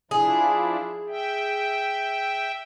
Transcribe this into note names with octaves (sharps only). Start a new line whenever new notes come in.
F3 D4 E4 G#4
E5 G5